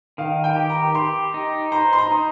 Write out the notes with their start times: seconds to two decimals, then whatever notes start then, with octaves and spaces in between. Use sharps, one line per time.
0.18 D#3 F5
0.44 G5
0.56 G4
0.70 A#5
0.95 G4 C6
1.34 D#4
1.72 C5 A#5
1.93 C6
1.98 A#5
2.12 D#4